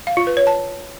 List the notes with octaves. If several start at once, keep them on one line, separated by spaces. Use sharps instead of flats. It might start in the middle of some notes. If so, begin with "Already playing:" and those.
F5
F4
B4
C#5
A5